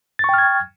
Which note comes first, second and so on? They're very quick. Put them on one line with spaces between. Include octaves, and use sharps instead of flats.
A6 C#6 G5 F6 G#6